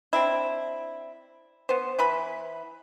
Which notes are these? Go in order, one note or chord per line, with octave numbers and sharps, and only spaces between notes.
C4 D4 E4
B3 C5
E3 B4 B5